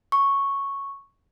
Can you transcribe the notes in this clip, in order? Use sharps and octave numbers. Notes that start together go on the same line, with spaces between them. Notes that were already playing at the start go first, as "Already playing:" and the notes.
C#6